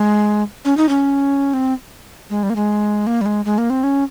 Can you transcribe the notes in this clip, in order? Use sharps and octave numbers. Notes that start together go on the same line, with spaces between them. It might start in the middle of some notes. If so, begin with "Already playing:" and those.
Already playing: G#3
C#4
D#4
C#4
C4
G#3
G3
A#3
G#3
A#3
G3
G#3
G#3
A#3
C4
C#4